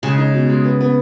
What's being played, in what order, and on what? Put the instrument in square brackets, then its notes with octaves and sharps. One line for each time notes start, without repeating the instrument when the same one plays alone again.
[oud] C#3 [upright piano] G#3
[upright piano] D#4
B2
G#3
B3
B3